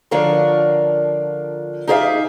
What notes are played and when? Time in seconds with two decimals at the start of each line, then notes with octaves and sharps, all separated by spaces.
0.11 D3 F3 D4 F4 A#4 C#5
1.87 D#4 G4 G#4 C#5 E5 F5